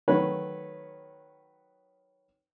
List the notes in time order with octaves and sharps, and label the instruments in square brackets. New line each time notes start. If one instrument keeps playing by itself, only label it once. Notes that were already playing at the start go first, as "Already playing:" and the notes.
[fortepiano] D#3 F#3 A3 F#4 B4 C#5